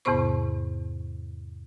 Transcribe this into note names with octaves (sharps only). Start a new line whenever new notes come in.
E2 G#2 C3 B3 C5 C#6